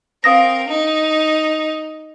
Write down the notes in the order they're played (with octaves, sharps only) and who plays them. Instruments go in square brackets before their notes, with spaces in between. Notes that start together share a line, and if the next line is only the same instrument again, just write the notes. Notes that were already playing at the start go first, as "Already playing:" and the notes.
[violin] C4 A#4 [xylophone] F5 D#6 A#6
[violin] D#4